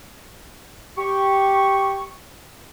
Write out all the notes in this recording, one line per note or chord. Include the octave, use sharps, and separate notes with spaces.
G4 C#6